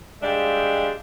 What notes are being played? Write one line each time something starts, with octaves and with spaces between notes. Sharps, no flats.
G3 G#3 D4 E5 F5 G5